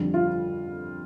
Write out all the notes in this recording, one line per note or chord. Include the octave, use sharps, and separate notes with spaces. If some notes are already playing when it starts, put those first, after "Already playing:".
Already playing: F2 D3 G3
F4